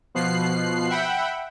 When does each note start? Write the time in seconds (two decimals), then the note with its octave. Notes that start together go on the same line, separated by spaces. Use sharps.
0.15 B2 F3 F#6 C7
0.90 E5 F#5 G5 B5